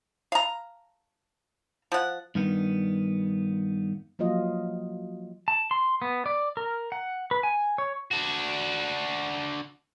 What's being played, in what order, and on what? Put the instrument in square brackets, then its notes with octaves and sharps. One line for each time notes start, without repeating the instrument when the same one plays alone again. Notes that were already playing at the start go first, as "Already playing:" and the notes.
[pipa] F5 A#5
F3 F#5
[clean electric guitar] G2 D#3 B3
[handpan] F3 F#3 A#3 F4 D#5
[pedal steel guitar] A5
C6
B3
D5
A#4
F#5
B4
G#5
C#5
[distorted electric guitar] D4 F#4